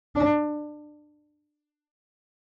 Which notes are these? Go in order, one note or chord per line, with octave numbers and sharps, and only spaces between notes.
D4